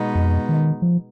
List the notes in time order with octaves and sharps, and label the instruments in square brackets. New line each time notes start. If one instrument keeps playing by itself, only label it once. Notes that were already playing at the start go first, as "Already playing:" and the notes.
Already playing: [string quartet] B2 G#3 B3 D#4
[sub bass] F2
D#3
F3